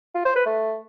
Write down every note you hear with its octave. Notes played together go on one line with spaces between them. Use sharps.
F4
C5
B4
A3